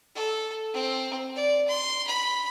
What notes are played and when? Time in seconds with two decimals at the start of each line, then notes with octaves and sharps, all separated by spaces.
0.15 A4
0.73 C4
1.36 D5
1.68 C6
2.07 B5